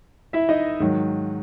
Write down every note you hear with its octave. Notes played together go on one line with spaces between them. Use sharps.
E4 E5
D#4 D#5
G#2 D#3 F#3